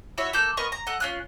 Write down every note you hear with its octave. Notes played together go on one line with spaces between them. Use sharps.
E4 F#4 C#5 E5
A#3 A4 G6
B3 A#4 D#5 C#6
A#5
A4 D#5 F#5
C#4 F4 F#6